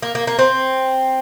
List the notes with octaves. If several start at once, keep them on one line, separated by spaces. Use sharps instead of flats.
A#3
A#3
A#3
C4